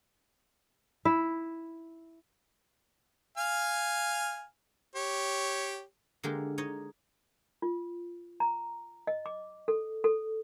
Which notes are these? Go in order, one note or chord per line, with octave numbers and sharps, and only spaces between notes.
E4
F5 G#5 F6
G4 C#5
D3 G#3 A#3 G4 A#4
D#4 C#5 D#5
F4
A#5
D#5
D6
A4
A4